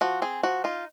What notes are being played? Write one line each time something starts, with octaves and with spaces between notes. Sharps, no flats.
F3 F#4
C4 G#4
F3 F#4
D#4 F4